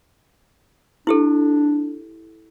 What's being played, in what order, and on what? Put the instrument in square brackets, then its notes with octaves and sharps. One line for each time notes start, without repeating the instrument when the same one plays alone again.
[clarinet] D4 [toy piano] E4 G4 A4